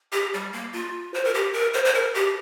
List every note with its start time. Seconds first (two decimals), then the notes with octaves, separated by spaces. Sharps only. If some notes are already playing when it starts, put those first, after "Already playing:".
0.13 G4
0.34 G3
0.53 A#3
0.73 F4
1.14 C5
1.24 A#4
1.34 G4
1.53 A#4
1.73 C5
1.85 C5
1.94 A#4
2.14 G4